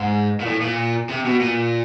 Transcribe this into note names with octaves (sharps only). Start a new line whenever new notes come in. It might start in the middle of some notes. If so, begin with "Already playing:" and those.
Already playing: G#2
A#2
A2
A#2
C3
B2
A#2